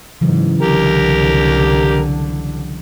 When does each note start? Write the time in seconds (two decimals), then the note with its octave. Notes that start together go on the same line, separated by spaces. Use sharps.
0.21 G#2 C#3 E3 F#3
0.62 C2 D3 G4 A#4